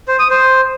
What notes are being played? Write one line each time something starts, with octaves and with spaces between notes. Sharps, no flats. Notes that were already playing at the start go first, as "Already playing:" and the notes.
C5
D#6
C5